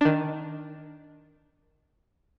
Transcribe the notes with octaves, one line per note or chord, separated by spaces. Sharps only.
D#3 D4